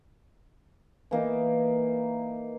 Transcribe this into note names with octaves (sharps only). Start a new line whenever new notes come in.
E3 A#3 D#4